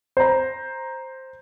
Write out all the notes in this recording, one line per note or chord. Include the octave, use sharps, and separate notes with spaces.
C5 A#5